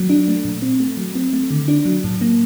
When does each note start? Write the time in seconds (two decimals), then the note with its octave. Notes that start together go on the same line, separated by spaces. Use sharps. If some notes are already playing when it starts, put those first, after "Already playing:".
Already playing: F#3
0.10 D4
0.28 A3
0.45 A#2
0.62 C4
0.80 A3
0.97 F#3
1.15 C4
1.33 A3
1.51 D3
1.68 D4
1.85 F#3
2.04 A2
2.21 A#3